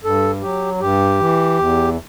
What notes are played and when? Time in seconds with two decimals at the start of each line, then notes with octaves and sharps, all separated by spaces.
0.04 G2 A4
0.42 F#3 G4
0.81 G2 G4
1.19 E3
1.59 E2